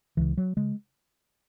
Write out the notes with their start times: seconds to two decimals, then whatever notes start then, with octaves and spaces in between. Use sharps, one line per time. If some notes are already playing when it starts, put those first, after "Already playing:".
0.17 C#2 C#3 E3
0.37 F#3
0.57 C#3 G#3